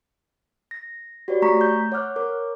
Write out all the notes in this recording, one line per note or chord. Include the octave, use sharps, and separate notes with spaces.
A#6
F#4 G4 B4 C#5 D5
A3 A#5 C#6 B6
G6
C#5 F#5 D6 F6 F#6
A#4 C#5 D6